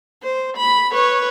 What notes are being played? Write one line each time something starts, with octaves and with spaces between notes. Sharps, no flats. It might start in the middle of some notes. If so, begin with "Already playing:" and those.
C5
B5
B4 C#5